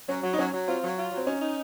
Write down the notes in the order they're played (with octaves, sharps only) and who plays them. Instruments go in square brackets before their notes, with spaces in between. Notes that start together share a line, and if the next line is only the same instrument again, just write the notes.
[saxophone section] F#3 [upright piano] C#4
[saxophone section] F#3
[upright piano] D#4
[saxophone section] F#3 [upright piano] C#4
[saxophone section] F#3
[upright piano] C4 [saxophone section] F4
[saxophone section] F#3
F4
F#3
[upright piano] C4
[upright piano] C#4 [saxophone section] D#4
[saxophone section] D#4